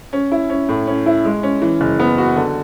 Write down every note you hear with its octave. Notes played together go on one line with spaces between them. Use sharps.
C#4
E4
C#4
A2
C#4
E4
G#3
C#4
E3
F#1
B3
F#4
D3